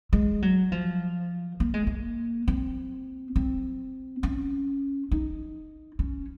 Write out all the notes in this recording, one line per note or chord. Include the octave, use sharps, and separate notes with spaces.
G#3
F#3
F3
A#3
G#3
A#3
C4
C4
C#4
D#4
C#4